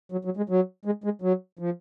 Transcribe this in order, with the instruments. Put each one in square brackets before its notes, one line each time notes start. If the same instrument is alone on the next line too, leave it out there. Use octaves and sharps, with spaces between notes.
[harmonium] F#3
F#3
G#3
F#3
G#3
G#3
F#3
F3